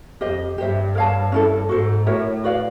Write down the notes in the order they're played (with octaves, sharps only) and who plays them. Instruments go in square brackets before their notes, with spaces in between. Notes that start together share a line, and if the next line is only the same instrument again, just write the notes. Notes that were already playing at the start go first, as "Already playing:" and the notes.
[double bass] F2 [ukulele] G4 C5 D#5
[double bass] G2 [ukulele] G4 C5 E5
[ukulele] A#4 C#5 F5 A5
C#4 E4 A4
[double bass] G#2 [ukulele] F#4 A4 C5
[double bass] A2 [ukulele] F#4 A#4 C#5 E5
[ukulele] F#4 B4 D5 F5